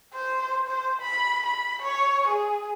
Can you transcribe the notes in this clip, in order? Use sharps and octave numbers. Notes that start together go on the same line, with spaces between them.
C5
C5
B5
B5
C#5
G#4